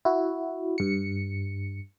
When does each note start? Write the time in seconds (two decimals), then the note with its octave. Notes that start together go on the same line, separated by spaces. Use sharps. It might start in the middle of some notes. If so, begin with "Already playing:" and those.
0.05 E4 F#4
0.78 G2 C#7